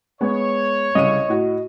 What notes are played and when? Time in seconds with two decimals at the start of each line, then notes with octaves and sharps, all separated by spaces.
0.21 G#3 B3 C#5
0.95 C2 C#3 D#5 D#7
1.29 A2 F#4